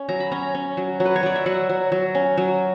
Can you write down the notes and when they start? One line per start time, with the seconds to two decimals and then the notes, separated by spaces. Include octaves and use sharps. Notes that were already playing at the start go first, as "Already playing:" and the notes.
Already playing: C#4
0.09 F#3 A#5
0.20 B5
0.32 C#4 A#5
0.55 C#4
0.77 F#3
1.00 F#3
1.05 B4
1.16 C#5
1.23 F#3 D5
1.36 E5
1.46 F#3 F#5
1.69 F#3
1.92 F#3
2.15 C#4
2.37 F#3